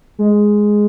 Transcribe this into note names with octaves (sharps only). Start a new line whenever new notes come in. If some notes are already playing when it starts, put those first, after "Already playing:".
G#3